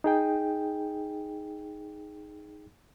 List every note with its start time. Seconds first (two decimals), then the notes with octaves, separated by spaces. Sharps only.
0.04 D#4 G#4 G5